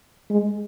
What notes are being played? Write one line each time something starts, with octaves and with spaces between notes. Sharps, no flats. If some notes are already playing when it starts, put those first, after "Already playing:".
G#3